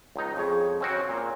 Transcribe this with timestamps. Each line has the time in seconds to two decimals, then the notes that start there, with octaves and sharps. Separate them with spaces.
0.16 C#2 D#4
0.37 F2 G#4 C#5
0.81 C#3 C4 F#4 C#5
1.09 A#2